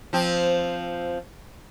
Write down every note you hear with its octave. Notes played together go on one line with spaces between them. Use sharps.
F3 C4